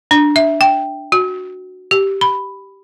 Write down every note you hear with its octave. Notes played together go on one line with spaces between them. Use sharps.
D4
E5
G5
F#4
G4
B5